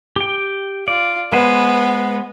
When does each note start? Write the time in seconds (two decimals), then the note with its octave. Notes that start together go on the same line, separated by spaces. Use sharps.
0.16 G4 G5
0.88 F4 D5
1.33 G#3 B3 B4 C5